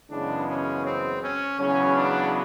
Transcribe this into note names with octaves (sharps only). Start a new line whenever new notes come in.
F#2 C#3 E3 G#3 B3 D4
C#4
C4
C#4
E2 C#3 F#3 B3 C#4
D4